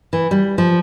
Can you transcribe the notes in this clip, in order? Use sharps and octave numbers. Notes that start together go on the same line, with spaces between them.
E3
G3
F3